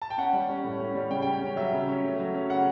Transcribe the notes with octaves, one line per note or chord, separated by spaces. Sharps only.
A5
G5
C#4 F#5
G3
C#4
A2
C#4
G3
C#3 G5
C#4 G5
C#4
F#3 E5
C#3
C#4
A3
F#3
C#4
C#3 F#5